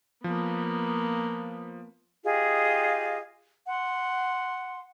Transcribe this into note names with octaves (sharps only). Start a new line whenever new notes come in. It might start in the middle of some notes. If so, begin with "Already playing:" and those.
F3 A#3 B3
F4 G4 G#4 D#5
F#5 C6